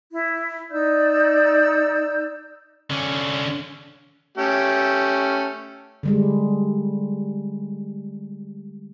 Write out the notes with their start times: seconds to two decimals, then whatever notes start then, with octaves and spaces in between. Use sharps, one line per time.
0.13 E4
0.72 D#4 D5 E6 G6
2.90 D3 C#4
4.38 A3 C#4 G4
6.03 D3 G3 G#3